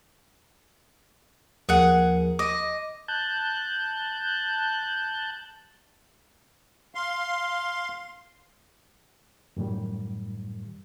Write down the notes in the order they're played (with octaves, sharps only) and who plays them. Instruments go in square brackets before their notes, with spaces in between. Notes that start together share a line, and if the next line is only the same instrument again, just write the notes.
[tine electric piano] D#2 F3 A#4 [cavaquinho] G#4 F#5
[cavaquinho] D#5 [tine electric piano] D6
[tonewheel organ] A5 F#6 G6
[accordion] F5 C6
[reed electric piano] F#2 A2 D#3 G3